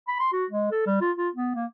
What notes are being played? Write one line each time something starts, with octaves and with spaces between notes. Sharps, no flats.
B5
C6
F#4
G#3
A4
G3
F4
F4
B3
A#3